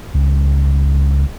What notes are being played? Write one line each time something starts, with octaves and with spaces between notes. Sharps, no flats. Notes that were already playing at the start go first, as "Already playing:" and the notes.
C#2